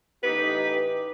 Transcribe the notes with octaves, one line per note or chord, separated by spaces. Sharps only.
A1 D#4 G4 B4